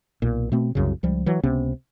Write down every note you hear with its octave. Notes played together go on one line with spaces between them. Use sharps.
B1 A#2
B2 A3 C4
C2 F#2 C#3
C#2 F3 G3
E3 F#3
C#2 C3 B3 C#4